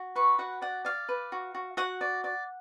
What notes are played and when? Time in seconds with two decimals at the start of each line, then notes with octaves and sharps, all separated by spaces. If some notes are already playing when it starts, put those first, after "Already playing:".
Already playing: F#4
0.15 B4 C#6
0.39 F#4 F#5
0.62 D5 F#5
0.85 D5 F5
1.09 B4
1.32 F#4
1.54 F#4
1.77 F#4 F#5
2.01 D5
2.24 D5